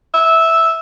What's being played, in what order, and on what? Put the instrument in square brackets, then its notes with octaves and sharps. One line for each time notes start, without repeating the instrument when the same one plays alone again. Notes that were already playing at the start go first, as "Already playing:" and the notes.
[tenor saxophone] E5